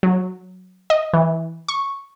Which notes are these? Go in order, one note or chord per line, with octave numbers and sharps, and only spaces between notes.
F#3
D#5
E3
C#6